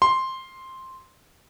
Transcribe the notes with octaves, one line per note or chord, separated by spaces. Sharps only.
C6